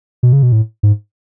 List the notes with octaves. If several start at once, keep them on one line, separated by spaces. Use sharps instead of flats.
B2
C#3
B2
A2
G#2